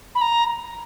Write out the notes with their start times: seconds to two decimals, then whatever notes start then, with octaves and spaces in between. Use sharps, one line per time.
0.15 B5
0.21 A#5